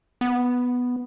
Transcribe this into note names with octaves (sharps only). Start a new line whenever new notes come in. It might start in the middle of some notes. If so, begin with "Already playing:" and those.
B3